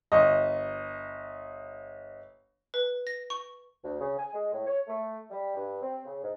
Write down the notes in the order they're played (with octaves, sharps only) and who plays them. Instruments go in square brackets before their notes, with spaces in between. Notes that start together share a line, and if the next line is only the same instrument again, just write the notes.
[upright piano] G1 D#5
[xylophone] B4
A#6
C#6
[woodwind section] D2
C#3
G#5
G#3
A2
C#5
A3
G3
G2
C4
C#3
G#2